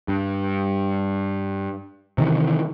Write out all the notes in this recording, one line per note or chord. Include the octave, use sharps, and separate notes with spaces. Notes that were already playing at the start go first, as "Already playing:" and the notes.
G2
C3 D#3 E3